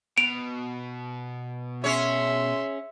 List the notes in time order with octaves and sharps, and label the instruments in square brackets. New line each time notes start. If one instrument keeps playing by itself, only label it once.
[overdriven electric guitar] B2 [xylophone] D7 F7
[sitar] C#4 G#4 C#5 [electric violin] E5 C6